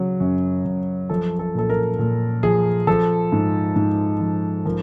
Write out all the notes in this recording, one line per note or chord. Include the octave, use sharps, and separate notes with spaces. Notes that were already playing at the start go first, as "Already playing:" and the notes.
Already playing: C#3 F#3
F#2
F#2
F3 A4
A4
A#2 A4
A#4
A#2
F3 G#4
F3 A4
G#2
G#2
F3
F3 A#4